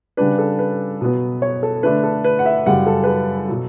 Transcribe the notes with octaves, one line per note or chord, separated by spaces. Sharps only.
C#3 G3 D4 B4
A4
B4
B2 F#3 B3
C#5
A4
D3 A3 D4 B4
A4
B4
F#5
E5
F#2 C#3 G3 F#5
A4
B4
A4
B2 F#3